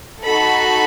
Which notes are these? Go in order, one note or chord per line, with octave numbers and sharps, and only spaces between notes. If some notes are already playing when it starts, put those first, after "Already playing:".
D#4 F#4 A4 B5